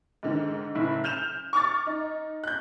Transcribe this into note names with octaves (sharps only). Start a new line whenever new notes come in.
G#2 D3 D#3
F#1 A2 E4
F6 G6 E7 F7
C#6 D6 F6 A6
D#4
F#6 G6